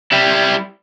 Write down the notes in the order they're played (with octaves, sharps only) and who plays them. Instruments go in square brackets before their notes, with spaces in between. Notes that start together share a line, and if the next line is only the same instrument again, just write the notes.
[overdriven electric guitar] G3 E4